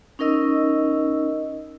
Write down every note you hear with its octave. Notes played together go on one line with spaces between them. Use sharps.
C#4 D#4 A#4 D#5 E6